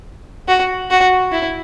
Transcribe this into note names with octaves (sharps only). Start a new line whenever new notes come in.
F#4
F#4
E4